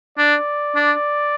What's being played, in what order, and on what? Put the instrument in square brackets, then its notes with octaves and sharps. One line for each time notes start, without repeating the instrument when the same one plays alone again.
[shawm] D4 [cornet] D5
[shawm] D4